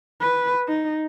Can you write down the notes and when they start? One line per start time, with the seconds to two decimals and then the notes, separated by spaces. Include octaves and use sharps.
0.21 B4
0.68 D#4